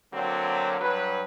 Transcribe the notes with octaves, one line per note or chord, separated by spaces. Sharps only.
D3 F#3 A#3 C4
G2 F#3 B4